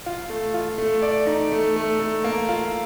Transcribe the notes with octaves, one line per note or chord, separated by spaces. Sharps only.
F4
A3
F4
A3
D5
D#4
A3
A3
A3
A#3
F4